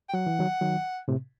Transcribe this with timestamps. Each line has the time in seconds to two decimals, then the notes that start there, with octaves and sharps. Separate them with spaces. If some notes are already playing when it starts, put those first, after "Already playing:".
0.09 G5
0.14 F#3 F#5
0.27 E3
0.39 D#3 F#3
0.61 D#3 F#3
1.08 A2 C3